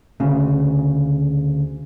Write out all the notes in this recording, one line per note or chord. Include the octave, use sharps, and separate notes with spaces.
D2 C#3